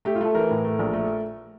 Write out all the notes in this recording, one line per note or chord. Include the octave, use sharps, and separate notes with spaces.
A3 G4
F4
A3 A4
E3 A#4
A2
A3
A#1
A3